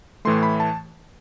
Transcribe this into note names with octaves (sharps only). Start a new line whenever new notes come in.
A2 E3 A3 C6
B5
A5